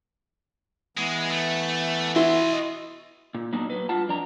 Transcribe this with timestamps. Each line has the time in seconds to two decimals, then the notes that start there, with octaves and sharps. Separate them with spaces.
0.97 E3 G#3 B3
1.31 A3
2.16 E4 F#4 C6
2.52 D#5
3.34 A#2
3.53 F#3 A#3 B3 D4 D#4
3.70 F#3 B4
3.89 G2 F4 F#5 A5
4.08 F2 D4 A#5